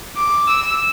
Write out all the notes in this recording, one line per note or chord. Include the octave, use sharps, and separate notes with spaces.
D6
E6